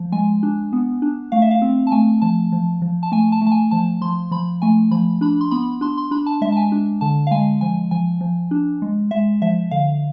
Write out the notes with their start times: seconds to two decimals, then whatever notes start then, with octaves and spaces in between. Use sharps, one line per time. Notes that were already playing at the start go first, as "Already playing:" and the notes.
Already playing: F3
0.12 G#3 G#5
0.43 D4
0.73 B3
1.02 D4
1.32 A3 F5
1.42 E5
1.51 F5
1.62 C4
1.87 A5
1.92 A3 G#5
2.22 F3 A5
2.52 F3
2.82 F3
3.03 A5
3.12 A3 G#5
3.32 A5
3.41 A3
3.46 A5
3.52 G#5
3.71 F3 A5
4.01 F3 C6
4.31 F3 B5
4.62 A3 G#5
4.91 F3 B5
5.21 D4 B5
5.41 C6
5.51 B3 B5
5.81 D4 C6
5.97 C6
6.11 D4 B5
6.26 A5
6.41 G#3 E5
6.52 A5
6.57 G#5
6.72 D4
7.01 D3 A5
7.27 F5
7.31 G#3 G#5
7.61 F3 G#5
7.91 F3 G#5
8.21 F3
8.51 D4
8.82 G#3
9.11 G#3 E5
9.42 F3 E5
9.71 D3 F5